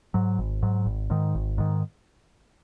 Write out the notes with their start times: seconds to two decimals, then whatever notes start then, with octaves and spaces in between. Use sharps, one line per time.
0.14 G#2 F#3
0.39 G#1
0.63 G#2 F#3
0.85 G#1
1.10 G#2 D#3
1.35 G#1
1.58 G#2 D#3